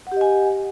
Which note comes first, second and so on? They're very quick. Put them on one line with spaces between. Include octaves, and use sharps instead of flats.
F#5 G4 D#5 G#5